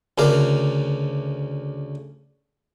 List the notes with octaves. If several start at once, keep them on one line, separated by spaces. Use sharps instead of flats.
D2 C#3 A#4 D5